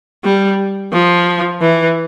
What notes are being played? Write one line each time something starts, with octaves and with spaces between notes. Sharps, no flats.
G3
F3
E3